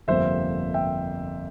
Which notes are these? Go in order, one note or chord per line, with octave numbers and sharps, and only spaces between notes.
G1 F2 C3 F3 A#3 C5 E5
E5 G5